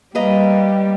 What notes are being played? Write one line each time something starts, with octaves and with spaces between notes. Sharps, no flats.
G3 A#3 B4 D#5 A#5